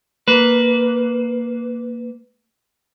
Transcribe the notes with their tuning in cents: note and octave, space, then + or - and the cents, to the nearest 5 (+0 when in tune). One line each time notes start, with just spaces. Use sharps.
A#3 +0 B4 +0